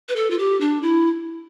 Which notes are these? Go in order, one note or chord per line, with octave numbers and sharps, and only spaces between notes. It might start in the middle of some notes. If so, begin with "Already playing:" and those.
B4
A4
F4
G4
D4
E4